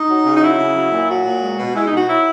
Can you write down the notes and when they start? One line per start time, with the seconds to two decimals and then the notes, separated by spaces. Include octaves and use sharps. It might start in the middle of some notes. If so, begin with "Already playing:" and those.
Already playing: D#4
0.10 F#3
0.25 C#3
0.36 D#4
0.42 F#3 E4
0.59 C#3
0.75 F#3
0.92 A#2
1.09 F#3 F#4
1.25 A#2
1.42 G#3
1.59 B2
1.75 G#3 E4
1.86 D#4
1.92 B2 F#4
2.08 F#3 E4